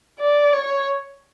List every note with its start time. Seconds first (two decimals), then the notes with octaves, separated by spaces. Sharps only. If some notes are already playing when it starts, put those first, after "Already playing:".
0.19 D5
0.54 C#5